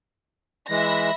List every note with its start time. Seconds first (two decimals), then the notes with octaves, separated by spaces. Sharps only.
0.70 E3 G#3 E5 B5 A#6